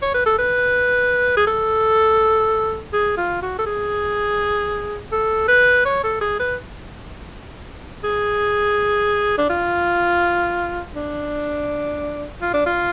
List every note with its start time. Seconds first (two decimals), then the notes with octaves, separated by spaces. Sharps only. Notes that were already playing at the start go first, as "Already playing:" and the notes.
0.02 C#5
0.14 B4
0.26 A4
0.38 B4
1.37 G#4
1.47 A4
2.93 G#4
3.17 F4
3.42 F#4
3.59 A4
3.66 G#4
5.12 A4
5.48 B4
5.85 C#5
6.04 A4
6.21 G#4
6.40 B4
8.04 G#4
9.38 D4
9.50 F4
10.95 D4
12.41 F4
12.54 D4
12.66 F4